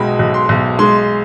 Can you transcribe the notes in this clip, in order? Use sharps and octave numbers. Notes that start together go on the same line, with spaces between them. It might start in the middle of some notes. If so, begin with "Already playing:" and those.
Already playing: B1 B2 G#3 D#5 G5 B5
B1
C6
B1
G#3 C6